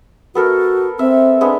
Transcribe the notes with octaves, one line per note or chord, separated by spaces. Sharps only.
B3 F#4 A4 A#4
C4 E5
G#3 B3 D4